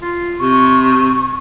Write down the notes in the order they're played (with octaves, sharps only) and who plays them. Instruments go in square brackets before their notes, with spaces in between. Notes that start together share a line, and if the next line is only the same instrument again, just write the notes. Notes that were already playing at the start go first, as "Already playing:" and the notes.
[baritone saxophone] F4
[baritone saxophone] C3 [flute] C#6